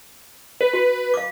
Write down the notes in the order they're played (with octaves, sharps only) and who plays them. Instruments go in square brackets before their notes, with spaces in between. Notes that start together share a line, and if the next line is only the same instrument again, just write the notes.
[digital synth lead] B4
[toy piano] F#4
F5 D6